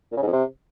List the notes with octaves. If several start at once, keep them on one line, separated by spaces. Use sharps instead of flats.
A#2
C#3
G#2
F2
C3